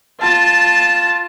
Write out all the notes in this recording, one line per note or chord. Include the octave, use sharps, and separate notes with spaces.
F4 A5